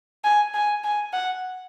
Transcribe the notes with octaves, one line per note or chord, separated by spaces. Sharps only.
G#5
G#5
G#5
F#5